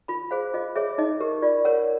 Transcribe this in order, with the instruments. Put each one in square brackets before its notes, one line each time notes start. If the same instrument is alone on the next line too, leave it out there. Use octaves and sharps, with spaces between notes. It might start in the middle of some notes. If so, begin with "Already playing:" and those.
[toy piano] F4 B5
G#4 C5 F5
F4 D#5
G#4 C#5 E5
D#4 D#5
G4 A#4
F4 D5
A#4 C#5 F#5